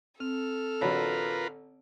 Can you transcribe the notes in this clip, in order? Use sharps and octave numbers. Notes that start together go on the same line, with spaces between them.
C4 A4 F6
A1 D3 F#3 F4 A#4 B4 C#5 B5